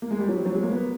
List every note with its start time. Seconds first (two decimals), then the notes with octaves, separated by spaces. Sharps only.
0.02 A#3
0.11 G#3
0.19 G3
0.29 F#3
0.37 F3
0.46 F#3
0.55 G#3
0.63 A#3
0.72 B3